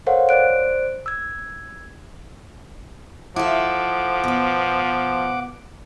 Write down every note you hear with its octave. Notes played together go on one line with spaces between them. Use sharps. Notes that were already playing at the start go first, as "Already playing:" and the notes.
A4 A#4 C5 C#5 F5 F#5
C5 D5 F#6 D7
E6 G#6
F3 E4 A4 F#5 D6
B2 B4